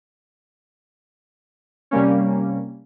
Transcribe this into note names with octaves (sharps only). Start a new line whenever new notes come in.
C3 G3 A#3 C#4